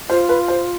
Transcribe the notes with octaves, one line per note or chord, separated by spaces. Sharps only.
F4 C5
B4
C5